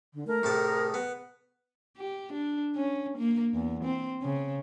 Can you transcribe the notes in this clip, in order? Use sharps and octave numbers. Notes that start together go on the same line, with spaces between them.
D3
A3 A#4
A2 C3 G#4 A5
B3
G4
D4
C#4
A#3
E2
C4
C#3